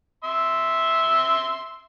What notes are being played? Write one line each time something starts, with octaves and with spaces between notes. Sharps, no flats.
E5 C6